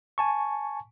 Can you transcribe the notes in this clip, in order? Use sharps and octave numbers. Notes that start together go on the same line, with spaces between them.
G#5 A5 C#6